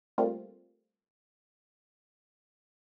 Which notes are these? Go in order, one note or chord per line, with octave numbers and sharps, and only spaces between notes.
G3 A3 A#3 C4 F4